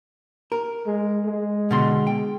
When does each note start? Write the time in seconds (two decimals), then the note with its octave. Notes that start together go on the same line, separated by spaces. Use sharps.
0.52 A#4
0.87 G#3
1.26 G#3
1.71 B2 D3 C6
2.07 G5